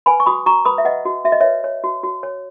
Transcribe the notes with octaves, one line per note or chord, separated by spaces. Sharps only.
B4 G#5 B5
C#6
F#4 B5 D#6
F#4 A#5 C#6
B4 B5 D#6
E5
B4 D#5 F#5
F#4
F#4 E5
D#5
B4 C#5 E5
C#5
F#4
F#4
C#5